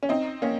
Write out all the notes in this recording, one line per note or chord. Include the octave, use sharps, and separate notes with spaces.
C#4
C4 D#4
A#3 C#4